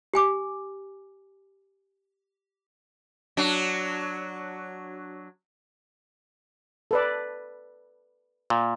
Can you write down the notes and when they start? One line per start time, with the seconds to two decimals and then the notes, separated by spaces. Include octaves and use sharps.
0.14 G4 G#5 D6
3.37 F#3 D4
6.91 A4 B4 D5
8.50 A#2